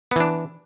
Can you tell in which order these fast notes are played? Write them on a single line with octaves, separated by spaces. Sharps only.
B3 E3 D4